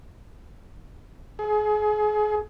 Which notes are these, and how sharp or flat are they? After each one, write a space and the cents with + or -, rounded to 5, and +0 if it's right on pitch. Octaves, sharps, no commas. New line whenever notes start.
G#4 +30